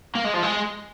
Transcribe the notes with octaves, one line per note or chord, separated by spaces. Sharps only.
A#3
G#3
F3
G#3